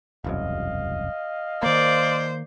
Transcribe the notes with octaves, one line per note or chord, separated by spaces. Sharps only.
E1 C2 F#2 D#5 F5
D#3 A#3 C5 D5